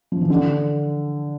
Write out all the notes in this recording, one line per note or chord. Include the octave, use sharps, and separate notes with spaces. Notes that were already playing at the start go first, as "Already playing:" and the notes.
F3
E3
D3